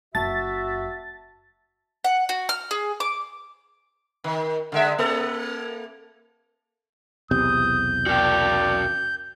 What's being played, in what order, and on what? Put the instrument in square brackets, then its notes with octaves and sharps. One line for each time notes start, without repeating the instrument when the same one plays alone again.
[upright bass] F#1 F#2 [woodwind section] F#4 E5 [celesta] A5 [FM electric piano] A6
[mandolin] F#5
F#4
F6
G#4
D6
[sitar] D#3
D3 G#3 E5
A#3 A4
[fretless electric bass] B1 E2 C3 [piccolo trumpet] D#6 [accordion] G6
[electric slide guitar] F#4 A#4 G5 [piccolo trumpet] D5